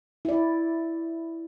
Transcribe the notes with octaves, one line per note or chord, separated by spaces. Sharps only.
E4 D5